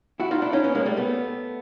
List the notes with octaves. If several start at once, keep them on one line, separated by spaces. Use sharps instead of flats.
E4 F#4
D#4 F4
D4 E4
C#4 D#4
B3 C#4
G#3 A#3
G3 A3
A3 B3